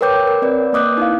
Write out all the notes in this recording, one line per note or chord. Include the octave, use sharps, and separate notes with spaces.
A#4 B4 C#5 G5 D6 G6
A#4
C4 B4 D5
A#3 D#5 D6 D#6 F#6 G6
D#4 E4 F5